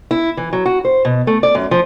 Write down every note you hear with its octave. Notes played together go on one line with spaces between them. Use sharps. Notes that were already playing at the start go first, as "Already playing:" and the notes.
E4
E3
F#3
F#4
C5
B2
A3
D5
F#2
F3